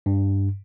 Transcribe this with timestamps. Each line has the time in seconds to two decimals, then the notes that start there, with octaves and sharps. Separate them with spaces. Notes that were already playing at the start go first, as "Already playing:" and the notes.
0.06 G2